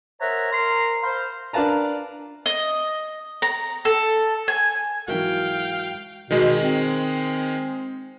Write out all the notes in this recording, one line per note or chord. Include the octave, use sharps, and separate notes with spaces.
A#4 C5 C#5 E5 F#5 A#5
A#4 A#5 C6
C5 F5 B5 C6
D4 A#4 B4 F5 A5 A#5
D#5
A#5
A4
G#5
G#2 E3 F#3 F#4 A#4 E5 F5 G5
B2 D#3 G#3
C4